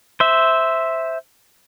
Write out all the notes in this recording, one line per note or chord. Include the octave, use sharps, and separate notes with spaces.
C5 E5